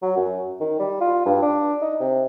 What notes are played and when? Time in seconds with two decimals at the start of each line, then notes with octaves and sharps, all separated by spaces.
0.02 F#3
0.17 F#2
0.60 D#3
0.79 G3
1.01 F4
1.26 G2
1.42 D4
1.82 D#4
2.00 C3